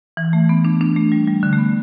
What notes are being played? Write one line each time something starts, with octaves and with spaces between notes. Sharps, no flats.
E3
A3
B3
D4
D4
A3
G3
G3
D3
A3
B3